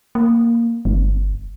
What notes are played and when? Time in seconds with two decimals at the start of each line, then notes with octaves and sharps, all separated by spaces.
0.15 A#3
0.85 G1